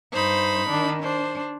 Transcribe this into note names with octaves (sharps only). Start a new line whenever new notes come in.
G2 D#4 C5 B5
D#3 D4
D4 C5